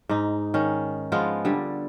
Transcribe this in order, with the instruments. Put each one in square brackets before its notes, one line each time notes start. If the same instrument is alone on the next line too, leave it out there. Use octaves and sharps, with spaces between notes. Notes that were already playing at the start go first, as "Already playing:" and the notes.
[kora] G#2 D#4
D#3 C#4
F3 G#3 B3 F4
D3 G3